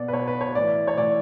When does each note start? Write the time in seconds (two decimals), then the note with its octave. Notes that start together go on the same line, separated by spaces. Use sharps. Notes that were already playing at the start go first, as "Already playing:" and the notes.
Already playing: B2 D5
0.08 B4
0.13 B2 C#5
0.27 B4
0.41 C#5
0.55 A2 E3 D5
0.87 C#5
0.98 A2 E3 D5